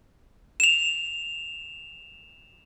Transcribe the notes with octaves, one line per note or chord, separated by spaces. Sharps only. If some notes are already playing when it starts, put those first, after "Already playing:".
E7 F7